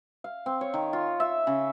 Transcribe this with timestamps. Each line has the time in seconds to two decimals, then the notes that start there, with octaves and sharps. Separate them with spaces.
0.24 F5
0.46 C4
0.61 C#5
0.74 D#3
0.93 F4
1.20 E5
1.47 C#3